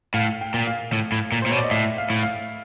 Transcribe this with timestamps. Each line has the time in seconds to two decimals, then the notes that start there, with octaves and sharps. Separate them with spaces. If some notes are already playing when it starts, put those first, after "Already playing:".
0.14 A2 F5
0.41 G5
0.54 A#2
0.67 F5
0.93 A2
1.12 A2
1.32 A#2
1.42 C5
1.46 A#2
1.49 B2 C#5
1.56 D5
1.64 D#5
1.71 A2 E5
1.98 F5
2.10 A2
2.23 F5